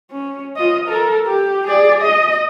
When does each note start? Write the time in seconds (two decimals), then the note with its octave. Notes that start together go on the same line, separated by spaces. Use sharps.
0.11 C#4
0.56 F4 D#5
0.88 A4 A#4
1.27 G4
1.68 G#4 D5
2.01 D#5